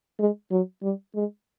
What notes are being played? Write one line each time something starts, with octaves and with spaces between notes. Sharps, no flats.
G#3
F#3
G3
G#3